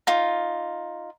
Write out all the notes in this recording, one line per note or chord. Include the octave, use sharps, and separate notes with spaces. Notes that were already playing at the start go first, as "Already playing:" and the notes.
D#4 F4